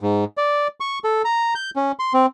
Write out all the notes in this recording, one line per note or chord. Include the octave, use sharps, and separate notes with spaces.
G#2
D5
C#6
A4
A#5
G6
C#4
C6
C4